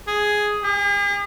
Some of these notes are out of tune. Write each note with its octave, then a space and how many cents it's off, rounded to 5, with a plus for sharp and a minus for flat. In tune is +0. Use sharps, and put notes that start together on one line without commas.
G#4 +5
G#4 -45